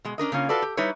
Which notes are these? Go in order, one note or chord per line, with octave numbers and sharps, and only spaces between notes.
B2 G#3
C#4 D4 A#4 D#5
C#3 A#3 C#4 F4
F4 F#4 A4 B4 D5
G4
G3 D#4 E4 B4 C#5